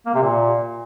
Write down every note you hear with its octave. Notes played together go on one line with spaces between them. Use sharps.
A#3
C3
A#2